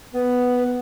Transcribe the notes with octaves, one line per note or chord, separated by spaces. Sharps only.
B3 B4